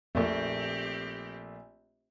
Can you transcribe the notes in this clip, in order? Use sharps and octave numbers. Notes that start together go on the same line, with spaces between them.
A#1 F2 A#2 A3 C4 G4